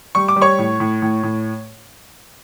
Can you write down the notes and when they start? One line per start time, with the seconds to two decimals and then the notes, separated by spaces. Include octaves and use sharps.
0.15 G3 C#6
0.28 D6
0.36 G3
0.42 C#5 C#6
0.58 A2
0.80 A2
1.02 A2
1.23 A2